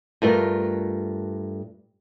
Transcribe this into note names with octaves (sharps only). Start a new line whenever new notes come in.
G2 A3 F4 A#4